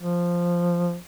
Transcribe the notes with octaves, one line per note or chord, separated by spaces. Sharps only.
F3